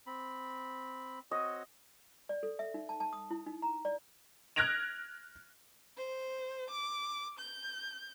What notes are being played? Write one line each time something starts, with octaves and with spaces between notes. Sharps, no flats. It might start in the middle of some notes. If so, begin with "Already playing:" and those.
C4 B5
C4 F#4 C#5 D#5
D5
A4
E5
D#4
A5
A5
D#6
E4
D#4
A#5
D5
F6 F#6 G#6 A#6 D7 F7
C5
D6
G6